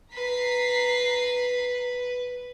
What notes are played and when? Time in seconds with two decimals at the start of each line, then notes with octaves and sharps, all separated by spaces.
0.13 B4 A#5 B6 C7